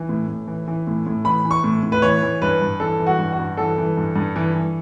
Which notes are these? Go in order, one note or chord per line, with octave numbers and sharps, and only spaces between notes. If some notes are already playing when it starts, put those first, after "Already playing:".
Already playing: E3
A2
A2
E3
E3
A2
A2
E3 B5
E3
C#6
A2
A2
B4
E3 C#5
E3
G2 B4
G2
E3 A4
E3
F#4
G2
F#4
G2
E3 A4
E3
G2
G2
E3
E3